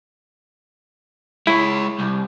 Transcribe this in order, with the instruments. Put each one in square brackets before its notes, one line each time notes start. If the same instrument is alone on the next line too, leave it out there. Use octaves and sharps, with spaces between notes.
[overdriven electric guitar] G#3 C#5 [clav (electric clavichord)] E4
[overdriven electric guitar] C2